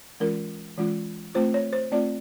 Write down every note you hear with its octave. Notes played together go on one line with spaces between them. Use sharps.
E3 G#3 C#4 F4 A#4
E3 G#3 C#4 F4
A3 C4 F4 C5
C#5
C5
A3 C4 F4 D5